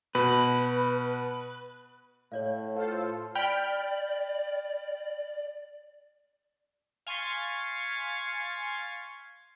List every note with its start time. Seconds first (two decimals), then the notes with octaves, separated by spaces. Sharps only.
0.15 B2 B4
2.32 A2 C#5 D5 F5
2.75 F4 A4 C5
3.35 D5 G5 B5 F6
7.07 F5 G#5 C6 C#6 A6 B6